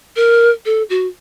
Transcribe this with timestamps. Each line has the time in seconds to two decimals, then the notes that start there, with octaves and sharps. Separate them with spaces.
0.16 A#4
0.66 A4
0.90 F#4